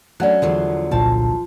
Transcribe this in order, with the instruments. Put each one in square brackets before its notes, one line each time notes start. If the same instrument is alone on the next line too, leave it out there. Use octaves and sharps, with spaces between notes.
[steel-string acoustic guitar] F#3 C#4 [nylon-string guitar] A3 D4 [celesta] D5 F#5 F#6
[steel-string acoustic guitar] E2 D3 F#3 [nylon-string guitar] F3
[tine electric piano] G1 C2 A#2 [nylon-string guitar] F3 A5